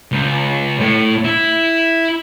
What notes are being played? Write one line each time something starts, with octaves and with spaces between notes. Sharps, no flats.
C#2
A2
E4